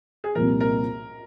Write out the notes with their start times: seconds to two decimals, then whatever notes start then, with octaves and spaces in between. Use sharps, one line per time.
0.24 G#4
0.35 C2 A#2 F3 A#4
0.60 A#4